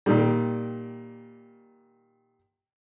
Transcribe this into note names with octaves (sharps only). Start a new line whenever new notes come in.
A#2 D#3 G3